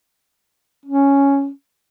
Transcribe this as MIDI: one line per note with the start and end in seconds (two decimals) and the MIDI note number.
0.85 1.50 61